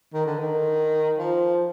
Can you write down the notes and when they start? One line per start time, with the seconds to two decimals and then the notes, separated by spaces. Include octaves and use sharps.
0.14 D#3
0.26 D3
0.39 D#3
1.19 F3